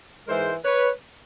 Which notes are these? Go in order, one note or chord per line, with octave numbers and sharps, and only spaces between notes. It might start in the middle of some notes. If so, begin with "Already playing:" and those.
G#2 E3 G#3 A#4 C5
B4 C#5